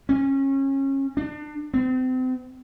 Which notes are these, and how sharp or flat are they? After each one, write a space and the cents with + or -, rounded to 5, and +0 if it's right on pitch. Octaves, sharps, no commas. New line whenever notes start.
C#4 -25
D4 +30
C4 -35